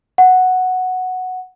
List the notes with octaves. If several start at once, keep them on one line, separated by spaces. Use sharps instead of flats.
F#5